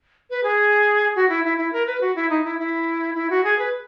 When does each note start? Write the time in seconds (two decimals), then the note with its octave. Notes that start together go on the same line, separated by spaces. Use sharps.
0.30 B4
0.44 G#4
1.16 F#4
1.29 E4
1.45 E4
1.58 E4
1.73 A#4
1.87 B4
2.01 F#4
2.16 E4
2.30 D#4
2.45 E4
2.59 E4
3.15 E4
3.30 F#4
3.44 G#4
3.59 B4